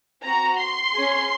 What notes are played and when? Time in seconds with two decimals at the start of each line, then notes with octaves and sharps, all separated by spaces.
0.23 C4 F#4 A#5
0.58 C6
0.93 C#4 G#4